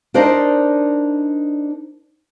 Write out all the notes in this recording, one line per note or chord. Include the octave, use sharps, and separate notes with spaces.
D4 D#4 A#4 C5 D5 D#5